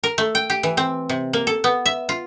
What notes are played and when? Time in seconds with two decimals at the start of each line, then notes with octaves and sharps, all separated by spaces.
0.04 A#4
0.18 A3
0.35 G5
0.50 G4
0.63 E3
0.77 C4
1.09 C3
1.33 A#3
1.47 A4
1.64 B3
1.86 E5
2.09 F4